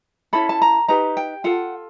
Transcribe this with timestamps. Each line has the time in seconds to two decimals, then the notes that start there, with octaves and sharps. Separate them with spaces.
0.33 C#4 E4 A4 B5
0.49 A5
0.62 A#5
0.88 D#4 G4 B4 A#5
1.17 G5
1.44 F4 A4 F#5